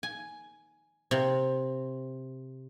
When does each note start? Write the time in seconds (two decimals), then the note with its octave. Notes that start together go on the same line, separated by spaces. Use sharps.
0.03 G#5
1.11 C3